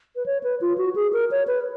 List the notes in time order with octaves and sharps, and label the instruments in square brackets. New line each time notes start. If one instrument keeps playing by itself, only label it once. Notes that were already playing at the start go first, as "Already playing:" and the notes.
[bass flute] B4
C#5
B4
F4
F#4
G#4
A#4
C#5
B4